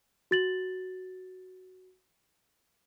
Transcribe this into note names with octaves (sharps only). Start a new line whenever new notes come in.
F#4 A6 F#7